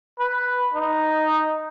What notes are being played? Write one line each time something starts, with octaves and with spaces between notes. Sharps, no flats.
B4
D#4